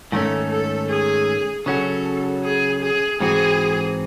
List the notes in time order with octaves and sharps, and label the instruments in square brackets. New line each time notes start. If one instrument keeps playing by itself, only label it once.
[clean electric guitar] G#2 D#3 A3 C#4 [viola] A4
[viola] A4
G#4
[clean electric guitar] C#3 F#3 C#4 F#4 [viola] A4
[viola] G#4
G#4
[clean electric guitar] G#2 E3 C4 F#4 [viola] G#4